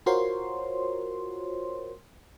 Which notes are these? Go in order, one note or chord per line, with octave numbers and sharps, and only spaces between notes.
F4 F#4 A#4 C5 C#5 C6